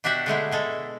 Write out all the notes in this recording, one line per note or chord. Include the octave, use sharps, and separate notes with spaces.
B2 D4 F#4 G4 E5 F#5
D3 G#3 A3 E4
B2 G#3 A4